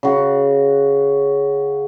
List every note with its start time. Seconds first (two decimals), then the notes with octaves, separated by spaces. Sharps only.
0.03 C#3 F#4